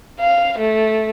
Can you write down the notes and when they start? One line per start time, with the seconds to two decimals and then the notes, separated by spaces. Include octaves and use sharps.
0.20 F5
0.59 A3